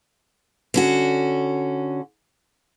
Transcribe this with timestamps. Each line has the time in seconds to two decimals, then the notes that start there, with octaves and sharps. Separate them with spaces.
0.74 D3 C#4 F#4